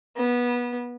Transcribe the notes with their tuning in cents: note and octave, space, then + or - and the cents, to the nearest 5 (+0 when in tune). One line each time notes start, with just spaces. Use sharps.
B3 -20